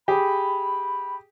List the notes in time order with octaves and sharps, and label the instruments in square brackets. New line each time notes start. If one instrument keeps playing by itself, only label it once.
[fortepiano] G4 G#4 [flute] B5